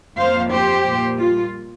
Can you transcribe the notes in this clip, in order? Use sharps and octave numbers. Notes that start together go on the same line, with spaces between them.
F2 F3 A#3 C5 F5
G4 C5
A#2 G3 A#3
F4